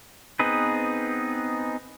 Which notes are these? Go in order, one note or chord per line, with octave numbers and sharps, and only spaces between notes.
B3 C4 D#4 G#4 B4